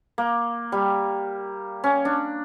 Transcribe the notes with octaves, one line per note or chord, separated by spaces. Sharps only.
A#3
G3
C#4
D4